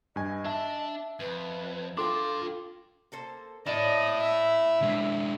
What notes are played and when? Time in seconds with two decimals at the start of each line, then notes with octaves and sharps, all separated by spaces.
0.16 G2 D#5 G#5
0.45 D4 E5 A5
1.20 F2 B4
1.98 D4 F4 A4 G5 C6 D6
3.12 A#3 A4 C5
3.66 E4 D5 D#5 A5
4.22 E5
4.82 G#3 D4